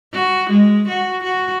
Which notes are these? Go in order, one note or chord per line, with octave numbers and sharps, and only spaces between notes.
F#4
G#3
F#4
F#4